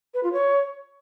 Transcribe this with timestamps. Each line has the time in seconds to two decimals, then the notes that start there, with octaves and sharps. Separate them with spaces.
0.14 B4
0.23 F4
0.33 C#5